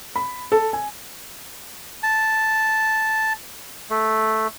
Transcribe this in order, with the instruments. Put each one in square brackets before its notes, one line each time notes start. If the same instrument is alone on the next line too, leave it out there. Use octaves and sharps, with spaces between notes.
[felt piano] B5
A4
G#5
[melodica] A5
A3